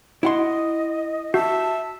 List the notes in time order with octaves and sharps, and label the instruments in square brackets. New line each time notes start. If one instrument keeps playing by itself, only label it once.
[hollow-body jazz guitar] E4 F#5 C6 [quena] D#5
[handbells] F#4 [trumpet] E5 [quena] A5